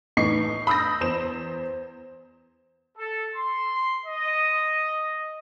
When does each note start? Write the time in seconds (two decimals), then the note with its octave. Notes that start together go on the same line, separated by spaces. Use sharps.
0.17 A2 E3 D#4 C#6 C7
0.67 B5 D#6 E6 G6 A#6
1.01 E2 C5 E7
2.98 A4
3.36 C6
4.06 D#5